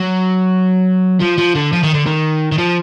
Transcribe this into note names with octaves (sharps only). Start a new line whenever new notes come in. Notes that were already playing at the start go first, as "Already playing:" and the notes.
Already playing: F#3
F3
F3
D3
F3
D#3
D3
D#3
D#3
F3